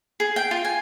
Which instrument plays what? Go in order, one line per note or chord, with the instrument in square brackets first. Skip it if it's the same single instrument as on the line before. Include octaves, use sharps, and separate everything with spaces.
[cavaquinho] G#4
G5
F4
G#5